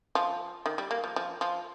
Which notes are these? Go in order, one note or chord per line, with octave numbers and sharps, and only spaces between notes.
F3
D#3
G3
A#3
F3
F3
F3